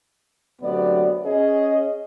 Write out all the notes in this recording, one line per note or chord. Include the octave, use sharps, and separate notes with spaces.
D2 C3 F#3 B3 D5
C#4 G#4 D#5